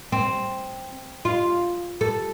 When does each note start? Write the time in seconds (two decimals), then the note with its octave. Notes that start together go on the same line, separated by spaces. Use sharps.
0.12 C4
1.25 F4
2.01 A4